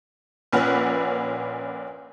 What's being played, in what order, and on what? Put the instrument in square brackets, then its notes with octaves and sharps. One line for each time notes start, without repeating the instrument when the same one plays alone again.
[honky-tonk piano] A#1 A#2 C#4 B4 F#5 F6